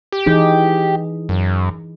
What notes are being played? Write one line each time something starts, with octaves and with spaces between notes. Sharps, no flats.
G4
E3 D#4 G#4
F#2